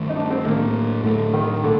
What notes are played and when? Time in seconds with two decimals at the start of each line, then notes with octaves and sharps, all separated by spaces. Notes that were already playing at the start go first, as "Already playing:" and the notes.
Already playing: G2 D#3 A3
0.09 D#4
0.16 D4
0.30 C4
0.45 A2 A3 A#3 D4
1.04 A2 D3 A3 D4
1.34 D#3
1.63 A#2 D3